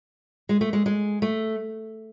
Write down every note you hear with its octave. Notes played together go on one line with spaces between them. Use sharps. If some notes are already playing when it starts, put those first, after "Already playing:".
G#3
A3
G#3
G#3
A3